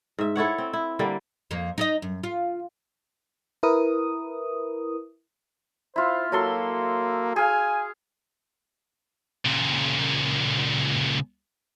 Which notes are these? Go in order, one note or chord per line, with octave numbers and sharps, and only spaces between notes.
G#2 E5
E4 A4 C#5 F#5
C4
E4
D3 G3 A#3
F2 A#3
D#4 D5 D#5
F#2
F4
E4 A#4 B4 D#6
E4 F4 C5
F#3 A#3 A4 C6
G#4 F5 G#5
C#2 A#2